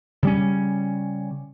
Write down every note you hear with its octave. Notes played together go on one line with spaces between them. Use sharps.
C#3 G3 C#4